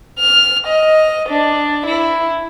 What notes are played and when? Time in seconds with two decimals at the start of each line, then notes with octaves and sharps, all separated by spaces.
0.18 F6
0.67 D#5
1.29 D4
1.85 E4